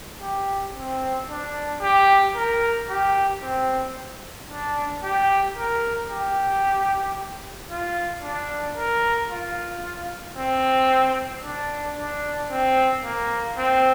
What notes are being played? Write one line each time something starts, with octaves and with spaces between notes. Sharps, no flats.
G4
C4
D4
G4
A#4
G4
C4
D4
G4
A#4
G4
F4
D4
A#4
F4
C4
D4
D4
C4
A#3
C4